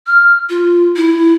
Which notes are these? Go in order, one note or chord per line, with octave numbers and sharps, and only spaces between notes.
F6
F4
E4